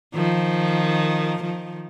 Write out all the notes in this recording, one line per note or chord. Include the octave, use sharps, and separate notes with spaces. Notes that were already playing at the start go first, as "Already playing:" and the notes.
D#3 F3
D#3 F3